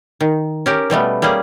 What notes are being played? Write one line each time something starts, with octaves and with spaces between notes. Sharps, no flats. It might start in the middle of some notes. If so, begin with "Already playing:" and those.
D#3
C#4 G4 A#4
B2 G3 A3 B3
G3 A#3 C#4 G#4